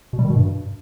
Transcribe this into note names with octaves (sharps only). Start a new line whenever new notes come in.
B2
G3
D#3
B2
G2